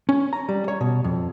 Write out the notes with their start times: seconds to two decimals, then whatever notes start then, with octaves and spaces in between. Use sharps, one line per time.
0.09 C#4
0.33 A#5
0.49 G3
0.68 C#5
0.81 B2
1.04 F2